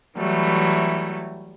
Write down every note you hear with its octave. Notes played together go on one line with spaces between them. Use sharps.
E3 F#3 G3 A3